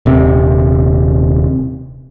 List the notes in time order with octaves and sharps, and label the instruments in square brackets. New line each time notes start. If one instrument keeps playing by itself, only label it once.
[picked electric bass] D#1 C3